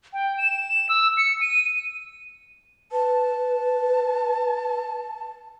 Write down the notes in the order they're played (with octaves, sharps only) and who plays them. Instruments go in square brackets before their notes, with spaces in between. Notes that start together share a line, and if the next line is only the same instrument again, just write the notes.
[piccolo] G5
E7
E6
C#7
D#7
[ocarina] B4 [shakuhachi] A5